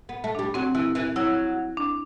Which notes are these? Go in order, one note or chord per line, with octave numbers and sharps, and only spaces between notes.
B3
A3
D4
G3
F#3 C4
E3 E4
E3
F#3 E4
D4